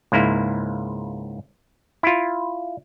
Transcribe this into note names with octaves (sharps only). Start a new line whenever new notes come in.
C#2 G#2 A#3 E4
E4 F4